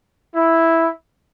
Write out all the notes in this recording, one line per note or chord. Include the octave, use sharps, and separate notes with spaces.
E4